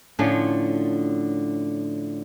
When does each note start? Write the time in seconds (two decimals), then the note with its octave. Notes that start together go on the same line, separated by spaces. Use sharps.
0.19 A2 D3 F3 C#4 D4 F4